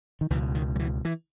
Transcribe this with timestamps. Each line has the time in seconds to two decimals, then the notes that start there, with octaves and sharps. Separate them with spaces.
0.21 D#3
0.30 C#2 B2 E3
0.55 D#3
0.76 F#3
0.79 E3
1.05 E3